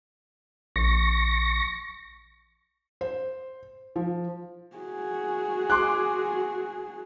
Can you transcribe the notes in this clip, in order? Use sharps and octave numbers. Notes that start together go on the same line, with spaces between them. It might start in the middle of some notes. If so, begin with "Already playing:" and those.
A#1 C#6 A#6
C5
F3
F#4 G#4
C6 D6 F#6